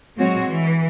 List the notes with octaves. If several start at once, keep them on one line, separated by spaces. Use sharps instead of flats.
F#3 G#3 C4 F#4 C#5
E3